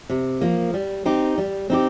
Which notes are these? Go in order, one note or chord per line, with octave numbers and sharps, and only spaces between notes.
C3
F3 A#3
G3
C4 D#4 G4
G3
C4 D#4 G4